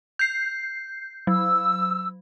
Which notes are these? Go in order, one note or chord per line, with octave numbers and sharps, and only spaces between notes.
G6 C7
F#3 E6